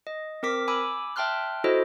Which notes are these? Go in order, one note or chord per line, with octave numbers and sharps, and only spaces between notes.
D#5
C4 A#4 D6 B6
G#5 B5 D6 E6
E5 G5 A5 C6 F6 F#6
E4 F#4 A4 C5 D#5